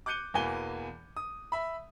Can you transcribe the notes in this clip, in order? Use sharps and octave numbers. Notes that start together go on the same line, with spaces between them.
D6 F#6 G6 C#7 D#7 G7
E2 B2 E3 A#3 G#5 G7
D#6
E5 B5